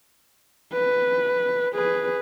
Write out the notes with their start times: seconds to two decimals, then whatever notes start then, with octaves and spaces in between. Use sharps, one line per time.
0.73 B4
1.75 G#4 B4